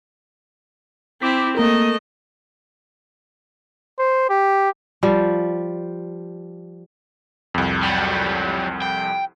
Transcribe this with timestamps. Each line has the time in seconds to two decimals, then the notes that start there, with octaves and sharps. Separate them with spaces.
1.22 C4 E4 D6 B6
1.57 A3 A#3 A#4 D#5
3.99 C5
4.29 G4
5.03 F3 G3
7.54 C2 F2
7.83 F#3 G3
8.82 G5